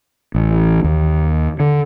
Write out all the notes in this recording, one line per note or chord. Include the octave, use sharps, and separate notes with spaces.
A1
D#2
D3